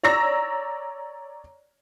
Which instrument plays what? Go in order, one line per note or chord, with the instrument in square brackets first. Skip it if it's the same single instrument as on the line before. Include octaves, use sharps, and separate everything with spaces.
[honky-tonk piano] C#5 D5 A#5 E6 A#6